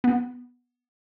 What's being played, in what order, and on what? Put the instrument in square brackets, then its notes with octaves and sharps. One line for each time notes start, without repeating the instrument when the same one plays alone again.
[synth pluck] B3